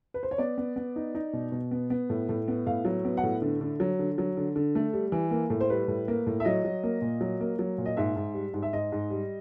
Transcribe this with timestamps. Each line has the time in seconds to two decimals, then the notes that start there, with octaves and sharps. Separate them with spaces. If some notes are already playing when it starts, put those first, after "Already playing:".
0.14 B4
0.23 C5
0.31 C#5
0.38 B3 D5
0.58 B3
0.76 B3
0.96 D#4
1.15 D#4
1.33 B2
1.52 B2
1.71 B3
1.90 B3
2.10 A2
2.29 A2
2.48 B3
2.67 A2 F5
2.85 F#3
3.05 B3
3.17 F#5
3.23 A2
3.42 D3
3.61 D3
3.80 F#3
3.99 D3
4.18 F#3
4.37 D3
4.56 D3
4.75 A3
4.93 G3
5.12 E3
5.31 A#3
5.50 A2
5.61 C5
5.70 G3 B4
5.88 A2
6.08 A#3
6.27 A2
6.40 E5
6.45 F#3 D#5
6.65 F#3
6.84 A#3
7.02 A#2
7.21 F#3
7.40 A#3
7.59 F#3
7.78 A#2
7.86 D#5
7.97 G#2 E5
8.16 G#2
8.34 G3
8.54 G#2
8.62 E5
8.73 G#2 D#5
8.92 G#2
9.10 G3